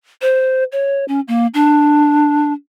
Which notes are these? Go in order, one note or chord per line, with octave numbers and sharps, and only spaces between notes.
C5
C#5
C#4
A#3
D4